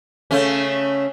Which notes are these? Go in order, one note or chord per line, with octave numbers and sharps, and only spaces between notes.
C#3 A3 C#4